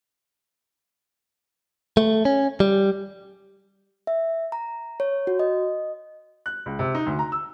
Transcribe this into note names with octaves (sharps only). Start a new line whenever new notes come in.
A3
C#4
G3
E5
A#5
C#5
F#4
D#5
F#6
C#2
C3
D#4
D2
A#5
E6